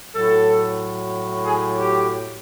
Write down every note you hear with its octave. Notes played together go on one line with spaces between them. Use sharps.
A2 F#3 A4
G#4
G4